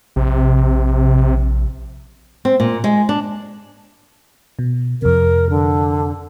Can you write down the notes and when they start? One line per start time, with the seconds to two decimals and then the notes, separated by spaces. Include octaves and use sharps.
0.16 A#1 C3
2.45 C4
2.60 A#2
2.84 G#3
3.09 D4
4.59 B2
5.02 F2 C3 A#4
5.50 D3